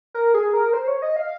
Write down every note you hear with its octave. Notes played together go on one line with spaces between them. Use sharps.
A#4
G#4
A#4
C5
C#5
D#5
F5